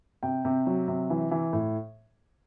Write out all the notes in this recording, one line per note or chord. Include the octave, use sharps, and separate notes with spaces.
C3 G5
C3
F#3
C3
E3
E3
A2